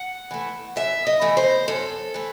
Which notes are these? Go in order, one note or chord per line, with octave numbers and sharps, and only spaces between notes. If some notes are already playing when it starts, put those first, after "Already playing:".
Already playing: F#5
E3 A3
F#2 E5
D#5
E3 A3
C5
F#2 A4
E3 A3